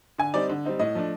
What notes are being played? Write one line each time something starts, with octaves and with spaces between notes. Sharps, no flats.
D3 G#5
G3 C4 D#4 D5
D3
G3 C4 D#4
A2 D#5
F3 A3 D4